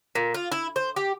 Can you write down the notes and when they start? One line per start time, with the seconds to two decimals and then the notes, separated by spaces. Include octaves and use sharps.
0.15 A#2
0.34 F4
0.52 E4
0.76 C5
0.96 G4